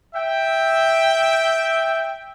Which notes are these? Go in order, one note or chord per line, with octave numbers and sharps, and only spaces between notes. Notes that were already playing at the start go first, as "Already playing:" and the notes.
E5 G5